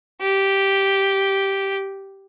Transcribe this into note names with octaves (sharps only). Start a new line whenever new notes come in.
G4